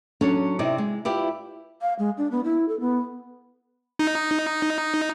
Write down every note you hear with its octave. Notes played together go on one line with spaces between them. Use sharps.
F#3 C#4 D4 A4 C#5
C3 C4 D#4 E4 D5
G#3
E4 F4 G4 B4 D5
F5
G#3
D4
B3
E4
A4
B3
D#4